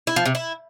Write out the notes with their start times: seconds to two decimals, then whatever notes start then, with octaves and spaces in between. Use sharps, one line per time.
0.07 E4
0.16 F3
0.26 C3
0.35 E4